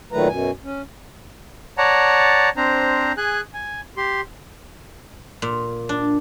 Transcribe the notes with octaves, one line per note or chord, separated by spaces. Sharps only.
A#2 D#3 F#3 A3 B4 A#5
F#2 B2 G#5
C#4
C#5 D5 F#5 A5 A#5
C4 D4 C5 A#5
G#4 G#5 F#6
G#5
G4 C6
A#2
D4